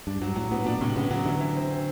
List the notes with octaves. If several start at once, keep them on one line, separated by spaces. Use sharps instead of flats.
G2 D4
G2 F#3
A2 F#3
A2 B3
A#2 D4
A2 C3
C#3 B3
C#3 F#3
D3 E3
E3
C4
C4